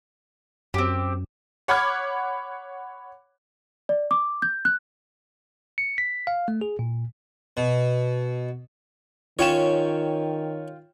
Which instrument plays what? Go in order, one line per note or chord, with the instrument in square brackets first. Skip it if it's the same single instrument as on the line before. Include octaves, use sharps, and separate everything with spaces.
[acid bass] F#2 [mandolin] C4 G4
[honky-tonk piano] C#5 F#5 B5 D6 F6 G#6
[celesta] D5
D6
G6
F#6
[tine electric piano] C#7
B6
F5
A3
G#4
A#2
[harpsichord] B2
[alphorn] D#3 [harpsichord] C#4 C#5 [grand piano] F4 G5 E7